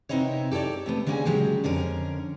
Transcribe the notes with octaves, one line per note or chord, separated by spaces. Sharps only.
C3 B3 C4 D#4 E4 C#5
G4 A4 A#4 C#5 D5
C3 A3 B3
D3 G3 A#3 C#4 G#4 G#5
A#2 C#3 F#3 G#3 G4
F2 D3 C#4 A#4